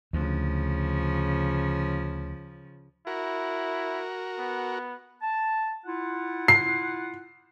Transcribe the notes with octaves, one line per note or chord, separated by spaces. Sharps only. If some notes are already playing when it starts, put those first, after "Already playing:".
D2 C#3 F3
E4 F#4 A#4
B3
A5
E4 F4 F#5
C7